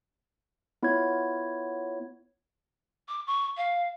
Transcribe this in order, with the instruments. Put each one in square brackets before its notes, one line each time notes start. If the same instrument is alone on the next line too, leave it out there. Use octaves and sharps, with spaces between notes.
[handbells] B3 E4 F4 C#5 G#6
[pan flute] D6
C#6
F5